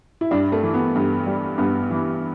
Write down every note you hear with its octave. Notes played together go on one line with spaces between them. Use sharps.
E4
G2 D4
A3
E3
B3
G2
G3
G2 B3
E3